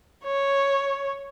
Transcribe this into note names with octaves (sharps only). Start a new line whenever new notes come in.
C#5